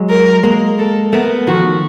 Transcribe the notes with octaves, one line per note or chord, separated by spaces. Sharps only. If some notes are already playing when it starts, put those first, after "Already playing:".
Already playing: F#3 G#3
A#4
G#3 A#3
A4
A3 B3 A#4
D#3 F3 F#4